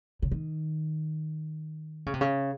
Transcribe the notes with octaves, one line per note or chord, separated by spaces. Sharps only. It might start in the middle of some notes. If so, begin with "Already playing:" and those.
C#3
D#3
C#3
C3
C#3